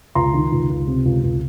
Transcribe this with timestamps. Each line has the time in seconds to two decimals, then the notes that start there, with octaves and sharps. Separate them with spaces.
0.15 C#2 A#5 C6
0.34 D#3
0.52 C#2
0.69 C#2
0.87 C3
1.05 C#2
1.23 C#2